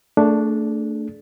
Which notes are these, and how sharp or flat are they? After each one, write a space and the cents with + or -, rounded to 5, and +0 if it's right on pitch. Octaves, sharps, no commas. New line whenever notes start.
A3 +25 D4 +0 G#4 +45